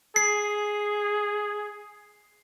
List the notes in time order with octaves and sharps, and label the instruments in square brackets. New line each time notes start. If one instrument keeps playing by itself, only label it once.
[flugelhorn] G#4 [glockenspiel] C7